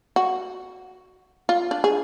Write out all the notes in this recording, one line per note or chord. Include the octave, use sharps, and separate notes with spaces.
F#4
F4
D4
G#4